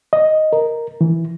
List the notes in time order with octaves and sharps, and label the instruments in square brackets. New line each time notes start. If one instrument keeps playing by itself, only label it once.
[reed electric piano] D#5
A#4
E3